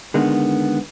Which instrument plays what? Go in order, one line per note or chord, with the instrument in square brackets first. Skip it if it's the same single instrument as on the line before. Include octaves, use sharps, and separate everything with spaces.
[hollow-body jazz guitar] D3 D#3 G#3 B3